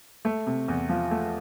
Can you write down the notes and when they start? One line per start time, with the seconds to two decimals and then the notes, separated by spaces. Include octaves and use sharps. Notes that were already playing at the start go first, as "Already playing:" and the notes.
0.25 A3
0.47 C3
0.68 E2
0.89 F3
1.11 A3